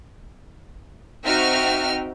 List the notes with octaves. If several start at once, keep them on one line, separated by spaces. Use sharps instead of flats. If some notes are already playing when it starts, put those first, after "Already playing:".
C4 D#4 F#4 E5 G5 F6